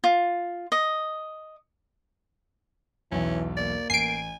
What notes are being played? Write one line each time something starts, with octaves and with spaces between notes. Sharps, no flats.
F4
D#5
B1 E2 E3 C#4
A#3 D5
A1 G#5 C7 D7